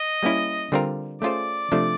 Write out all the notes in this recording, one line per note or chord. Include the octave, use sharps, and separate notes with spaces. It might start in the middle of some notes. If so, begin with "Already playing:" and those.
Already playing: D#5
G3 A#3 C#4 E4
D3 G3 C4 F4 A#4
A3 C#4 F4 G#4 C5 D5
C3 F3 A3 D4